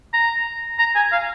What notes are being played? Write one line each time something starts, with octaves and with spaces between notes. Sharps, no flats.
A#5
A#5
G#5
F5